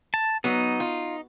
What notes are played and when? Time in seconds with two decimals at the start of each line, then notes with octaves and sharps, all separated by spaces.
0.14 A5
0.44 F#3 B3 D#4
0.80 F4